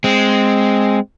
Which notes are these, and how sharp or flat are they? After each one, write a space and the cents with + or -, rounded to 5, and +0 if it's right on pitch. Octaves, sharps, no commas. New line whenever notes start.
G#3 +0 C4 +0